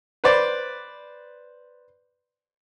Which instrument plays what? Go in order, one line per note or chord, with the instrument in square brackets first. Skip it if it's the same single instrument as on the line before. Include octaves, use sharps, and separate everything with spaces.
[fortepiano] B4 C5 D5